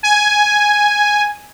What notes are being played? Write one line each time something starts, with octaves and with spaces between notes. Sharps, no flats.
G#5